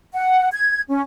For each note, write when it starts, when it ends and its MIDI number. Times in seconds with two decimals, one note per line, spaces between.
0.13 0.48 78
0.52 0.81 92
0.89 1.01 61